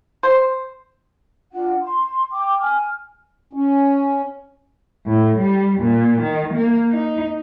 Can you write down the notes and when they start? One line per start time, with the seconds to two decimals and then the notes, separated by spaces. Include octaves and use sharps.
0.23 C5
1.53 D4 F4 F#5
1.82 C6
2.32 G5 D6
2.61 G#5 F6
3.53 C#4
5.06 A2
5.38 G3
5.81 A#2
6.22 D#3
6.54 A#3
6.90 D#4